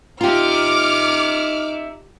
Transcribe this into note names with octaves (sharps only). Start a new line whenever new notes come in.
D#4 F4 G4 E5 A#5 D6 F6